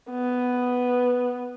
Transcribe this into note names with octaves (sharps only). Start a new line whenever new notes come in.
B3